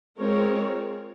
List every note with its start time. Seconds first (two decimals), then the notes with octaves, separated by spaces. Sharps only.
0.18 G#3 C4 F4 A#4 C#5